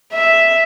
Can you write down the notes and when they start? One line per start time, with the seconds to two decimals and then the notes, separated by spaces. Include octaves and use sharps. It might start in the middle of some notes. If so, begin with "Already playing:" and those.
0.13 E5